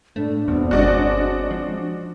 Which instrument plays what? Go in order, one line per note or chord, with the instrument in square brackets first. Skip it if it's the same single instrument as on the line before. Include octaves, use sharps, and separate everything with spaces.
[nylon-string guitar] A2 [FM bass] A3 [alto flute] D4
[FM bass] E2 [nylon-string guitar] B2 C4
[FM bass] G1 [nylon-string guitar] G#3 C4 C#4 [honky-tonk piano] F#4 D5 D#5
[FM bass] F3